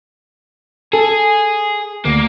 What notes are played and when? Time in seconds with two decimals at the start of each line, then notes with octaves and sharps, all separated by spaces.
0.93 G#4 A4
2.05 D2 A#3